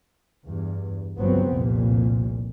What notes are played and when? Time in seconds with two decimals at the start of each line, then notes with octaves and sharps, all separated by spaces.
0.47 E2 G2
1.19 G1 C#2 F3 F#3 B3 C4
1.53 F1 C2 F2 A#2